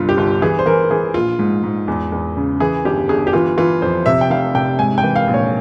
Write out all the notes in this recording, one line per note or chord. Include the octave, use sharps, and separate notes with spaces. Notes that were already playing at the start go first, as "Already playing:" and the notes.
Already playing: G1 C2 G2 F4
G4
G1 F4
E3 G#4
C5
E3 A#4
E3 G#4
A#1 F4
G#2
G#2
E2
E2
C#3
E3 G#4
G1 G4
G1 G#4
G4
E3 F4
E3 F4
F2 C5
C3 E5
G5
F1 F5
C3 G5
G#2 G#5
G5
E3
F5
A#1
C#5